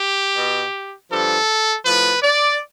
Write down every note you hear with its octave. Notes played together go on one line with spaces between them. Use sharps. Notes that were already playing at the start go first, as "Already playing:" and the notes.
Already playing: G4
B2
G2 F3 A4
A2 F3 B4
D5